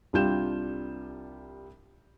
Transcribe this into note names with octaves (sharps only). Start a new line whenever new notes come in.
C2 G3 D4 F4 G6 E7